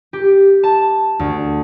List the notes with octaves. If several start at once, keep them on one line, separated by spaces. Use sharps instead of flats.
G4
A5
D2